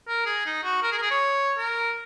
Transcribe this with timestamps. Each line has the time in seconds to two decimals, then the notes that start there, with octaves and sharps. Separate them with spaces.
0.08 A#4
0.26 G#4
0.46 D#4
0.63 F#4
0.82 A#4
0.92 G#4
0.98 A#4
1.02 G#4
1.11 C#5
1.58 A#4